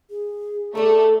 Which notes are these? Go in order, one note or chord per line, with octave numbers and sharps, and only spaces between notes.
G#4
A3 A4 D5